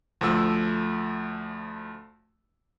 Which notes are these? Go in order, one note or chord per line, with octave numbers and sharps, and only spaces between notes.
D2 F3 A3 E6